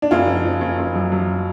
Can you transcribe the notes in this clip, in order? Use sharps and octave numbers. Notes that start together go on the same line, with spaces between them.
D4
F#1 F4
F3
F3
F#1
F#1
F#2
F#2